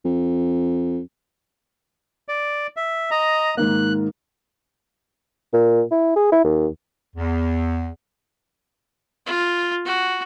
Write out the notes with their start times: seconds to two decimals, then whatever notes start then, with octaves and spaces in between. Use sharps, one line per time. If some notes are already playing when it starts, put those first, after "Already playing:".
0.05 F2
2.28 D5
2.76 E5
3.11 D#5 A#5
3.57 G#2 D#3 A#3 F#6
5.53 A#2
5.91 E4
6.16 G#4
6.32 E4
6.44 D#2
7.16 E2
9.26 F4
9.85 F#4